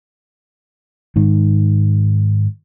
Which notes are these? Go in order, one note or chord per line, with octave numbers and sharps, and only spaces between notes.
G#2 D#3